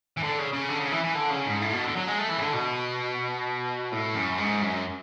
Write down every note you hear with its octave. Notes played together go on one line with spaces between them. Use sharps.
E3
D3
C#3
C#3
D3
C#3
E3
E3
D3
C#3
G#2
A2
B2
D3
F#3
G#3
A3
E3
C#3
D3
B2
A2
F#2
G#2
F#2